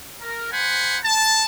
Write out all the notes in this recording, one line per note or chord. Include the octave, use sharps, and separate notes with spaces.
A#4
C5 F#5 G#5 B5
A5